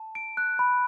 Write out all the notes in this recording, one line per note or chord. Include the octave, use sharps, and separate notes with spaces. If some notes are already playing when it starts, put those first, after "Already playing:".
Already playing: A5
D7
F#6
B5